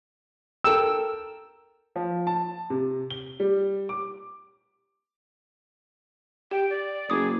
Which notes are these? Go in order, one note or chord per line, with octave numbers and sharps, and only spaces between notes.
A4 A#4 G5 E6
F3
A5
C3
G7
G3
D6
G4 G5
D5
F#1 G#4 D6 D#6